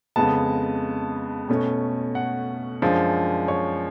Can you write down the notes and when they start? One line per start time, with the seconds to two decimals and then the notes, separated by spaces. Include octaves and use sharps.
0.16 F2 C#3 G#3 B3 A5
1.49 B2 A3 C#4
2.15 F#5
2.82 F#2 F3 G#3 D4
3.48 C#5